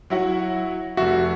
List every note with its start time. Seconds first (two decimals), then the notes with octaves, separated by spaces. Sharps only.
0.10 F#3 E4 F#4
0.97 F1 F#4 E5